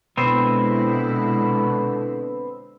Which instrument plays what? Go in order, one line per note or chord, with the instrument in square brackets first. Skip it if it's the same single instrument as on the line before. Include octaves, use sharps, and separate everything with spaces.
[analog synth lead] B2 [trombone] D3 [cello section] G#3 E4 [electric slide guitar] B3 C4 C5